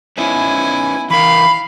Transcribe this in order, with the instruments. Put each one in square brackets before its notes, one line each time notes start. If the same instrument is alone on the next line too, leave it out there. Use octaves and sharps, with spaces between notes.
[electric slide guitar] B3 C#4 D#4 [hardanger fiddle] E4 G#5
[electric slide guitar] E3 A#4 [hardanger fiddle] F5 [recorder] B5